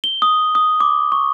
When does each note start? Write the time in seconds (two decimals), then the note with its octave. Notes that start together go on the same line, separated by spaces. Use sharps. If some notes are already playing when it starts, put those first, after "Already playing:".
0.04 G7
0.22 D#6
0.55 D#6
0.80 D6
1.12 C#6